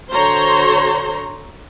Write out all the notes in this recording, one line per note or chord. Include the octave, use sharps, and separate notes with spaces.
D3 F#4 C5 C#5 A#5 C6